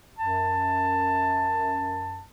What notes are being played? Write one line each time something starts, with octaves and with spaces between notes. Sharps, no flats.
F#2 A5